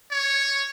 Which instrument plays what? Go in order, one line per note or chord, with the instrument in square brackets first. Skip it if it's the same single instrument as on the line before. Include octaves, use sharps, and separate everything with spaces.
[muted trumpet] C#5